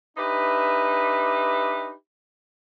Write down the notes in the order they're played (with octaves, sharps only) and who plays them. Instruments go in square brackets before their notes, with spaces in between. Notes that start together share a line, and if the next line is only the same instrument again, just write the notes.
[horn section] D4 D#4 G4 B4 E5